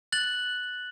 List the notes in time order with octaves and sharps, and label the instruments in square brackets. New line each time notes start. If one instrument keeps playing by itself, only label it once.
[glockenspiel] F#6 A6 F#7